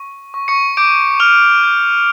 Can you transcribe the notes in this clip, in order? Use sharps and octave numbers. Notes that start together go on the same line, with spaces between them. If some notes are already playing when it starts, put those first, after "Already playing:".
Already playing: C#6
C#6
C#6 C#7
D6 G6 D7
C#6 F6 F7
G6